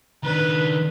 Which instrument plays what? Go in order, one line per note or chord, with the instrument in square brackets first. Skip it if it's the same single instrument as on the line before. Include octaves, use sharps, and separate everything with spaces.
[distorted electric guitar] D#3 D4 [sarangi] B4